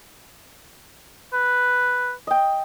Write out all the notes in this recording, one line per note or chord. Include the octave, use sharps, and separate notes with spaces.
B4
D#5 G5